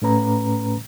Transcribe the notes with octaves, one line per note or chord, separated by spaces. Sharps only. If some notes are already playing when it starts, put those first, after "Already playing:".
A2 A3 C#4 B4 A#5